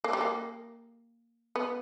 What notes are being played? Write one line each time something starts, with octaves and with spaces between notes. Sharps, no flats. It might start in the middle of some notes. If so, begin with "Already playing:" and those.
A#3
G3
A#3
B3